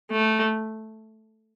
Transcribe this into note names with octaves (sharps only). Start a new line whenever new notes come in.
A3